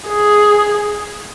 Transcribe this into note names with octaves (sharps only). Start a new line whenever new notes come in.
G#4